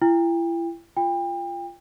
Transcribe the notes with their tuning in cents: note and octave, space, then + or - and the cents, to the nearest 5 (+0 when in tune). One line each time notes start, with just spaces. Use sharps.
E4 +35 G5 +35
F4 -15 G5 +35